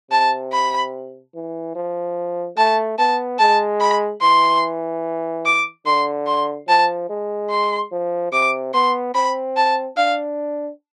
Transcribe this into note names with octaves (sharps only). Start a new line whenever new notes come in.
C3 A5
B5
E3
F3
A3 A5
B3 A5
G#3 A5
B5
E3 C6
D6
D3 C6
C6
F3 A5
G#3
C6
F3
C3 D6
B3 C6
C4 B5
A5
D4 F5